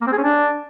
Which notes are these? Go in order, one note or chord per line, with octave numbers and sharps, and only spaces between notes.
A#3
C4
G#4
C#4
D4